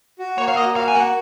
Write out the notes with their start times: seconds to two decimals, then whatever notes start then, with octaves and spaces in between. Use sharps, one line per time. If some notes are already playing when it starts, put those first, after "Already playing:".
0.19 F#4
0.38 A#3 C#5
0.48 F5
0.57 A#3 D#5
0.76 F#4 F5
0.88 G#5
0.95 A#3 F#5